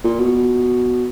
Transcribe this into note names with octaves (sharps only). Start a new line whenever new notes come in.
A#2
B2